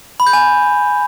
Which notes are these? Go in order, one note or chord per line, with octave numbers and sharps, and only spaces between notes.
B5
G6
G#5